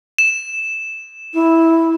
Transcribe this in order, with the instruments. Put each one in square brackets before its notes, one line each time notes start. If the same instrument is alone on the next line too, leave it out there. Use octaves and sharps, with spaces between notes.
[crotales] E7
[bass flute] E4